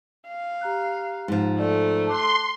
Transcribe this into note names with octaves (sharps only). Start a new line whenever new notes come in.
F5
G4 A#5 F#6
G#2 F3
A3 D5
A5 C6 D6 F#6